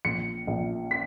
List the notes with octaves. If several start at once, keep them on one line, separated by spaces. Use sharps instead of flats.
A#1 C#7
A#1
B6